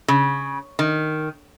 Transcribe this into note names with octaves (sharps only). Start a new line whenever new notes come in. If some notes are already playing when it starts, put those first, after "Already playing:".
C#3
D#3